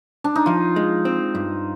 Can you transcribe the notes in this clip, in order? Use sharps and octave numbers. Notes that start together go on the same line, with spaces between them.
D4
D#4
F3 F4
G#3
C4
G2